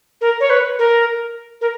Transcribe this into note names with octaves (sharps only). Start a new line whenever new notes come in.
A#4
C#5
B4
A#4
A#4